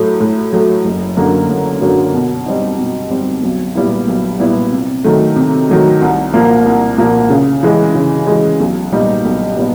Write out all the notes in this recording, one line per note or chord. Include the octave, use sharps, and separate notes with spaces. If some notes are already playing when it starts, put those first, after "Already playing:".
Already playing: A2 F#3 A3
A2
F#3 A3
F#1
F#2 D3 F#3 A#3
F#1
F#2 D3 F#3 A#3
B2
G3 C4 D#4
B2
G3 C4 D#4
B1
A#2 G3 B3 E4
B1
A#2 G3 B3 E4
C3
D#3 F#3 A3
C3
D#3 F#3 A3
C2
A#2 F3 A#3
C2
A#2 F3 A#3
C#3
E3 G#3
C#3
E3 G#3
B1
A#2 G3 B3 D#4
B1
A#2 G3 B3 D#4